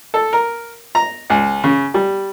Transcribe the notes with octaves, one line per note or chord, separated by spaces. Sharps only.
A4
A#4
A#5
C#2
C#3
G3